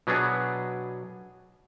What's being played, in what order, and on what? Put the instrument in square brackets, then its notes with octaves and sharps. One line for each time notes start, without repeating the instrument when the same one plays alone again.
[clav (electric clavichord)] B2 F#3 B3 D4 G#4